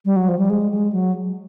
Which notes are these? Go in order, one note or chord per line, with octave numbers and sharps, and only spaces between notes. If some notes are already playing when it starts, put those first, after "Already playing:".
G3
F#3
F3
G3
G#3
G#3
F#3